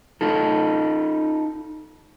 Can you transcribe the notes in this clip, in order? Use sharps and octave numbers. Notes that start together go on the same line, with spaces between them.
D#4 F4 A4